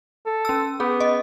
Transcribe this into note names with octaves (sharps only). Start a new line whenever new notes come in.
A4
C#4 E6
B3 G#4
D#5